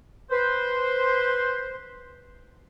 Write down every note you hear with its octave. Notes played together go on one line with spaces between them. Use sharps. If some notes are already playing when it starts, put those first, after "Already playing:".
B4 C5